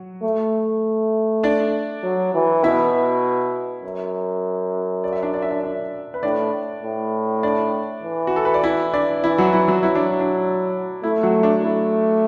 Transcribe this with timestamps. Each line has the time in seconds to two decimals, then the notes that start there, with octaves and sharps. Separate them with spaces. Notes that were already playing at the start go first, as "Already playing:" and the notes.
Already playing: F#3 F#4
0.23 A3
1.43 D4 D5
2.03 F#3
2.34 E3
2.64 B2 E4 E5
3.83 F#2
5.04 D5
5.13 E5
5.22 D4 D5
5.34 D5
5.42 E5
5.51 D4 D5
5.63 D4 D5
6.14 B4
6.23 A2 D4 D5
6.83 A2
7.43 D4 D5
8.03 E3
8.27 F#4
8.36 A4
8.45 B4
8.54 D5
8.64 E4 E5
8.93 D4 D5
9.23 E3 E4
9.38 F#3 F#4
9.53 E4
9.68 F#3 F#4
9.83 F#3 E4
9.95 D4
10.20 D4
11.03 A3 E4
11.23 F#3 F#4
11.43 D4
11.63 A3 E4